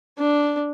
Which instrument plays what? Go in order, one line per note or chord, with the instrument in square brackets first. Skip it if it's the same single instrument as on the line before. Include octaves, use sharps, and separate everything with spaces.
[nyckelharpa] D4